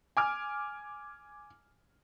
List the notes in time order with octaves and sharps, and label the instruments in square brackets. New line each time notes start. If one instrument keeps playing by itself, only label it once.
[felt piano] G#5 D6 F6